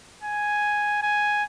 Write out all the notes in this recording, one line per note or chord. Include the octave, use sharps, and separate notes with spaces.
G#5
G#5